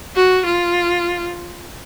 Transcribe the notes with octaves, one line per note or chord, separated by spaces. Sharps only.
F#4
F4